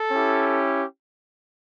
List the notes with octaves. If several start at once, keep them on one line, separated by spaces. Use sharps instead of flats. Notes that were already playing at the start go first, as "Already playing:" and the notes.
Already playing: A4
C#4 E4 G4